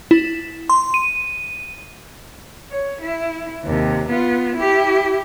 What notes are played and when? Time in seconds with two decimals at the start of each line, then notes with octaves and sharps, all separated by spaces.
0.11 E4
0.70 C6
0.94 D#7
2.71 C#5
3.01 E4
3.64 D#2 C3
4.07 B3 F4
4.56 E4 G4